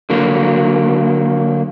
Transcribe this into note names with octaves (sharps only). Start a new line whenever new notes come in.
D3 F#3 A#3